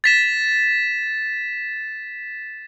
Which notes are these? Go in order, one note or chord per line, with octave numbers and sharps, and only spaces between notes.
A6 B6 E7